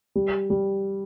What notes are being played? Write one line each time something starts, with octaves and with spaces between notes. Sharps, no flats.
G3
G3